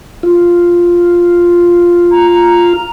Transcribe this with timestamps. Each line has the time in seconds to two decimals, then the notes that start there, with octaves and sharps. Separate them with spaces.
0.23 F4
2.12 A#5